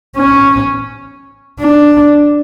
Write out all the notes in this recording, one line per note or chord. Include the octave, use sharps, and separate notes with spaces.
C#4
D4